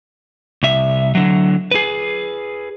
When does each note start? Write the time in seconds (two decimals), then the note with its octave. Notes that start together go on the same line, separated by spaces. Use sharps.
0.63 C2 E5
1.15 D3 F#3
1.71 G#4 B4